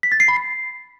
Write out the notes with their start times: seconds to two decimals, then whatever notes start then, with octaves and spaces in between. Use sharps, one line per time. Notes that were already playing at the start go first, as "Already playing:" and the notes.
0.03 B6
0.12 A6
0.20 C7
0.28 B5
0.37 C7